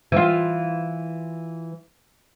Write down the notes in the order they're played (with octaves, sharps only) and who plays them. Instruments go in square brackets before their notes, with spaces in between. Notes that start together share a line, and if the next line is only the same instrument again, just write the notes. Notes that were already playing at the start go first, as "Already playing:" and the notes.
[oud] E3 F4